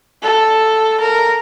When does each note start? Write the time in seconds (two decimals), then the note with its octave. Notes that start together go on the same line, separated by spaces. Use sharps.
0.22 A4
1.00 A#4